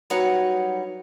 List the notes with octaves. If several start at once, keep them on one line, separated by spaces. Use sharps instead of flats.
F#3 G3 D#4 B4 C#5 F#5